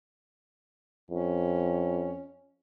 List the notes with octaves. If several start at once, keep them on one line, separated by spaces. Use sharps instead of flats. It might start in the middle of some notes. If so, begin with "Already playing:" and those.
F2 C#4